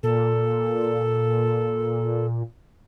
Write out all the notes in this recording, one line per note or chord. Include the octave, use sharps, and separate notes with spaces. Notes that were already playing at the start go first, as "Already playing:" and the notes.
A#2 A4